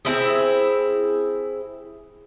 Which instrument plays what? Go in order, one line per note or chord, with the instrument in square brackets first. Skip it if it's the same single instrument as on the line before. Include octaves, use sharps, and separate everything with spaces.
[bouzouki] C4 E4 G#4